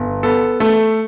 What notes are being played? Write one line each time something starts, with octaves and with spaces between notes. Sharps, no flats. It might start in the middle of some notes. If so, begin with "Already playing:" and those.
Already playing: G1
B3 A4
A3 A4